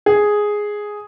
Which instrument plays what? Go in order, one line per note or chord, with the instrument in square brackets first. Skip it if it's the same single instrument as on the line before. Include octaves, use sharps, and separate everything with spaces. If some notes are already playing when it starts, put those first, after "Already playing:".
[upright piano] G#4